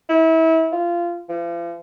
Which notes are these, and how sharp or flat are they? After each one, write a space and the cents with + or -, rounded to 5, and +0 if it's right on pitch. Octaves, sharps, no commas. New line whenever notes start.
E4 -30
F4 -20
F3 -40